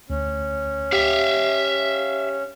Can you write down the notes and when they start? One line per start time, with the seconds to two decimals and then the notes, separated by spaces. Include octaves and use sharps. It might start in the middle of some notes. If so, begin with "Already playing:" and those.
0.10 D2 C#4
0.93 G4 E5 F5